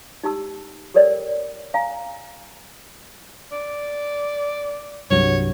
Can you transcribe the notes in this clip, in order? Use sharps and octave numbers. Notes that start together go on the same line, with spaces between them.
D#4 G4 A5 E6
G4 A4 A#4 C#5 D5 G5
F5 G#5 A#5
D5
C2 G2 F#3 C#5